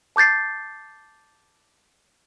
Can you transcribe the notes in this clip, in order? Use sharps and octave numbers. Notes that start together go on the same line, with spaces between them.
A5 D6 G6 A6 C7